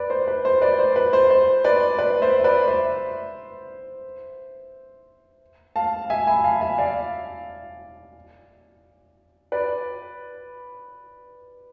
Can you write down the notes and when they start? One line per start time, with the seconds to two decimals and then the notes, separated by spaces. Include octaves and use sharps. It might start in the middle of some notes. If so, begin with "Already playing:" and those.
Already playing: B4 D5
0.10 C5
0.28 B4
0.45 C5
0.61 B4 D5
0.79 C5
0.96 B4
1.13 C5
1.30 C5
1.64 B4 D5
1.98 B4 D5
2.22 C5 E5
2.44 B4 D5
2.67 C5 E5
5.76 F5 A5
6.10 E5 G#5
6.27 G#5 B5
6.44 F5 A5
6.61 E5 G#5
6.78 D5 F5
9.52 B4 D5